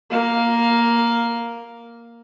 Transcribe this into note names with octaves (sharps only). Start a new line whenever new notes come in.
A#3 F5